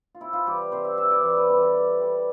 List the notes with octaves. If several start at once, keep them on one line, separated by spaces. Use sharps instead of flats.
F4
C3 E4
F4
E3 G3 G4
C3 C5
E5
E3 G3 E5
D5
E3 C5
B4
G3 C4 A4
G4
E3
G3 C4